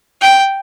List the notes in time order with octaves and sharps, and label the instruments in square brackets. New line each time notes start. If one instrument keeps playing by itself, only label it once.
[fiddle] G5